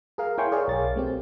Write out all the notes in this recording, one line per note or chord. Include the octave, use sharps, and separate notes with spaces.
G#4 A#4 F5
E4 C#5 G5 G#5 C6 C#6
G#4 A#4 C#5 D5 F5
B1 A6
A3 C4 G4